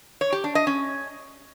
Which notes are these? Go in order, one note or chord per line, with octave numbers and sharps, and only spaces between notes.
C#5
G4
D4
D#5
C#4